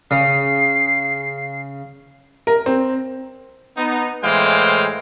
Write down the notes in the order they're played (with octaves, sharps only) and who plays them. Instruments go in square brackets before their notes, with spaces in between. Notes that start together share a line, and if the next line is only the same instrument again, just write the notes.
[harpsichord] C#3 [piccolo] C7
[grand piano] A#4
C4
[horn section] B3 D#4
A2 E3 G#3 C5 F5 G5